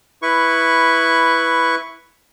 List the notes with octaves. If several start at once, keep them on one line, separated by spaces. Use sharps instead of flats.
E4 B4 C#6